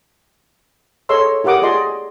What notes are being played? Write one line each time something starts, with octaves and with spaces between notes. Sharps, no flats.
G#4 A4 C#5 D#5 C6 E6
E4 G4 A#4 F#5 D6 D#6
F4 G#4 D5 D#5 C6